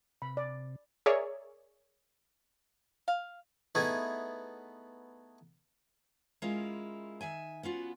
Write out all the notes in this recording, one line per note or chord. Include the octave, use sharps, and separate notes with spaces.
C3 B5
D5
G#4 A#4 C#5 D5 E5
F5
A3 B3 D#4 E4 G#4
G#3 C#4 E4 F4 A#4
D#3 E5 G#5
B3 C#4 F4 F#4